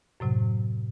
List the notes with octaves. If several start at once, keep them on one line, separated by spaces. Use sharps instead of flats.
F#2 A2 C3 F#3